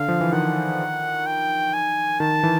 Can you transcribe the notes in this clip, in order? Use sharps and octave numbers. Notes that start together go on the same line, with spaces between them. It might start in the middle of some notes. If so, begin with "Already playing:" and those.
Already playing: D3 F5
F3
E3
D#3 F#5
G5
G#5
D#3 A5
E3